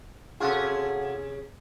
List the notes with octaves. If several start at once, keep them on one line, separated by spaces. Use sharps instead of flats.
C3 C#4 F4 F#4 G#4 A4